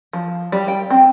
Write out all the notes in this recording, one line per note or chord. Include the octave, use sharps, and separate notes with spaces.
F3
G3
G5
C4